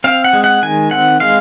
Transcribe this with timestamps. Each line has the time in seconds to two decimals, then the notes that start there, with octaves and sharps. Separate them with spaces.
0.04 C4 F5
0.24 F#5
0.33 G#3
0.44 F#5
0.63 D#3 G#5
0.91 C4 F#5
1.20 G#3 F5